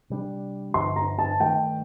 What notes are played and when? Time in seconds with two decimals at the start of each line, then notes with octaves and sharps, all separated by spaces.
0.10 C3 G3 D4
0.74 G2 D3 F3 C6
0.96 A#5
1.18 A5
1.40 G2 D#3 A3 G5